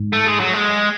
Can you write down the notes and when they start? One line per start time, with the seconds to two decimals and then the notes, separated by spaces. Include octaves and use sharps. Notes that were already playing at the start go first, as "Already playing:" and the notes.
Already playing: G#2
0.13 A3
0.26 G#3
0.40 F#3
0.54 G#3